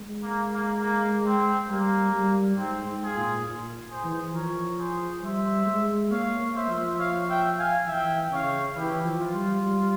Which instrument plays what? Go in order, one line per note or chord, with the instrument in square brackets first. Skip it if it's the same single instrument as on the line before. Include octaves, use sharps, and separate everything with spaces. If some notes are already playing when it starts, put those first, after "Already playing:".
Already playing: [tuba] G#3
[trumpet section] A#3
A#3
A#3
C4
[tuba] G3 [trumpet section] A#3
[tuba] G3
[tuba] G#2 [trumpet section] C4
[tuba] G#2
[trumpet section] F4 G#4
[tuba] A#2
A#2
[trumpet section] G#4 C5
[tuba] E3
[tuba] F3 [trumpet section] A#4 C#5
[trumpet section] G#4 C5
[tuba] G3 [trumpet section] C5 E5
[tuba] G#3
[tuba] A#3 [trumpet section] C#5 F5
[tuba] A#3
[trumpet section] C5 E5
[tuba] F3
[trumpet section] C#5 F5
E5 G5
F5 G#5
[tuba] E3 [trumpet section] E5 G5
[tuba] C#3 [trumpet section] C#5 F5
[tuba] E3 [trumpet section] E4 G4
[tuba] F3
[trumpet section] F4
[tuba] G3
G3